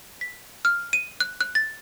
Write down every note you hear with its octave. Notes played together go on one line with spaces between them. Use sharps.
B6
F6
D#7
F#6
F#6
A6